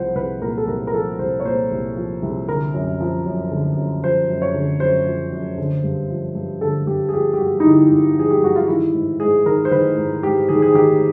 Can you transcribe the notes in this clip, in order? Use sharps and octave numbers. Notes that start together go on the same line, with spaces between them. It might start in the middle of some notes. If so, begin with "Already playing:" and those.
Already playing: C2 F3 C5 F#5
C2 B4
A#2 A#4
A4
C2 A#4
A#4
F3 A4
C2 C5
C#5
A#2 C5
C2
F3
C2
D3 A#4
F#2
F3
F#2
D3
F#2
F3 C5
F#2
C#5
D3
F#2 C5
F3
F#2
D3
G2
F3
G2
D3 A4
G2 G4
G#4
F3 G4
G4
G2 F#4
D#4
D3 E4
G2
F3 G#4
G4
G2 F#4
F4
D#3 E4
G#2
G#2 G#4
D#3 A#4
C5
D#3 B4
G#2
G#2 G4
D#3 G#4
G#4
D#3 G4